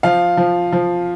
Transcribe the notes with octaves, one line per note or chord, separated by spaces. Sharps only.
F3 F5
F3
F3